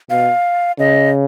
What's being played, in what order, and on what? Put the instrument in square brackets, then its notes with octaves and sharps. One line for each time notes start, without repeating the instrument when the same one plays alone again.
[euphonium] B2 [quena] F5
[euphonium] C#3 [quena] D#5